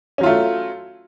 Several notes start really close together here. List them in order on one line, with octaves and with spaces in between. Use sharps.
C#4 F#3 F4 A3